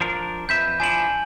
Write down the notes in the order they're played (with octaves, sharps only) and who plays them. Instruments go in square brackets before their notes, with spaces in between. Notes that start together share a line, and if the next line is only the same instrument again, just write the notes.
[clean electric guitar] F3 D4 A#4
[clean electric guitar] F2 B4 E5 [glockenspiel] G6
[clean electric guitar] F3 D4 E4 [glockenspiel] G#5 F#7